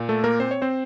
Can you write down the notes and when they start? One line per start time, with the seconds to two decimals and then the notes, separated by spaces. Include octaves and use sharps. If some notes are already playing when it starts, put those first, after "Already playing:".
Already playing: A#2
0.09 A3 A4
0.24 A#3 A#4
0.40 C4 C5
0.51 C#5
0.62 C4 C5